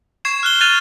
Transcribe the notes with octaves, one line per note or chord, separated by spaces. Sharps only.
C#6 G#6 C7 E7
F6 F#6 G7
F6 F#6 G#6 A6 D#7 F7